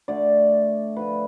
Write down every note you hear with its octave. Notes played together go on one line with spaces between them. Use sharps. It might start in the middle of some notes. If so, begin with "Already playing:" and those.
D3 A3 D5
D3 F3 A3 B4